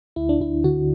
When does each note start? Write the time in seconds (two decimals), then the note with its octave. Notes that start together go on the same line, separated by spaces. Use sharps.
0.16 D2 E4
0.29 D4
0.41 D2 E4
0.64 D3 F#4